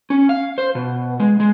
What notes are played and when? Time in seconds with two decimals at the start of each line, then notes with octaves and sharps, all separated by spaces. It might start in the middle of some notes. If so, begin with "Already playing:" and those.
0.10 C#4
0.29 F5
0.58 C5
0.75 B2
1.20 G#3
1.40 G#3